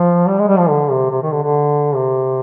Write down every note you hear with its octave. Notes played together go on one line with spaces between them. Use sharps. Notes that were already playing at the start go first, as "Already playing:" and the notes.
Already playing: F3
G3
G#3
G3
F3
D3
C3
C3
D#3
D3
D3
C3